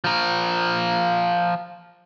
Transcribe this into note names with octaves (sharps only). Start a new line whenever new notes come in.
F3 A#4